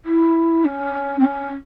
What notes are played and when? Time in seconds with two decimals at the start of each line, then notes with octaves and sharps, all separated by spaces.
0.05 E4
0.64 C#4
1.19 C4
1.24 C#4